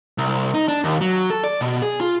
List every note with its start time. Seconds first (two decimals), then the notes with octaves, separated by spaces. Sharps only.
0.18 C2
0.54 D#4
0.68 D4
0.84 D#2
1.01 F#3
1.30 A4
1.44 D5
1.61 B2
1.82 G#4
2.01 F4